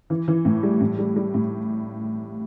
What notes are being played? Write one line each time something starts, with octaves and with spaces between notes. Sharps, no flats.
E3
E3
A2
G3
A2
G3
G3
A2